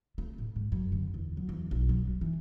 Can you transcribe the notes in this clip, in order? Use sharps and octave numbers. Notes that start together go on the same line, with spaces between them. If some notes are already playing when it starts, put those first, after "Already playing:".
A3
A2
G#2
F#2
D3
E2
F#3
E2
B1
F#3
G2
E3